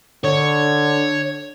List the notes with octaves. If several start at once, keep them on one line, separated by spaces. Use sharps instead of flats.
D3 C#5